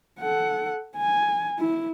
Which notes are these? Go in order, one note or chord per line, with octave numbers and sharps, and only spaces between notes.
A4 F#5
G#5
E4